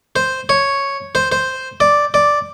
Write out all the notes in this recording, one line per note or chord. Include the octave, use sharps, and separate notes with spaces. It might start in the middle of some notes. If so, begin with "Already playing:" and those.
C5
C#5
C5
C5
D5
D5